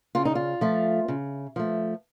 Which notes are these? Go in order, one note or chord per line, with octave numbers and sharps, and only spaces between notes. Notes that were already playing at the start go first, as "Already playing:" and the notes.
C#3 F4
D#4
F4
F3 A3
C#3
F3 A3